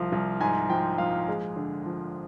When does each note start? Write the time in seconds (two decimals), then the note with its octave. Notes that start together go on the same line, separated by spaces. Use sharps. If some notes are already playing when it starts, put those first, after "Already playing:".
Already playing: C2 F3 F5
0.12 C2
0.40 G#2 G#5
0.69 F3 G5
0.98 A#1 F5
1.28 G#3
1.56 D3
1.86 F3